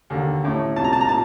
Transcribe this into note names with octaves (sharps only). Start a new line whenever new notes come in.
D#2 D3
A1 A2
C2 A#2 A5
A#5
A5
A#5
A#2 A5